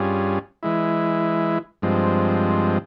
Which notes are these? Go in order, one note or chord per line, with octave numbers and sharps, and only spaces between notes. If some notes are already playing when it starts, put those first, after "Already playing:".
Already playing: G2 G3 C#4 F4 G#4
E3 G#3 E4
G2 F3 G#3 C4